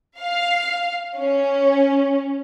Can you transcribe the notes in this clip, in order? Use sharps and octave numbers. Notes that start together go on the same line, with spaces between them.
F5
C#4